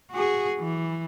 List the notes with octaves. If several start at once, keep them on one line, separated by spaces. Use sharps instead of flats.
F#4 G#4
E3